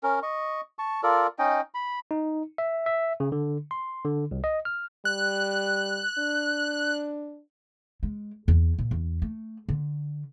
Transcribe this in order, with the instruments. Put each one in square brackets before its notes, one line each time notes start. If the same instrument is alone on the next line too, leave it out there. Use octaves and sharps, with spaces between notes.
[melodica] C#4 A#4
D#5 C#6
A5 C#6
F4 A4 A#4 D5
C#4 D#4 D#5 G5
B5
[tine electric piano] D#4
E5
E5
C#3
D3
C6
D3
C2
D#5
F6
[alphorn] G3 [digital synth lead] F#6
[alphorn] D4
[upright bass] G#3
E2
A#2
E2
A3
D3